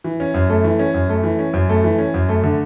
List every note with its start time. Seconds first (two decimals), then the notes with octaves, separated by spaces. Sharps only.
0.04 E3
0.20 C#4
0.34 F#2
0.49 A3
0.64 E3
0.79 C#4
0.94 F#2
1.09 A3
1.24 E3
1.39 C#4
1.54 F#2
1.69 A3
1.84 E3
1.98 C#4
2.14 F#2
2.29 A3
2.44 D3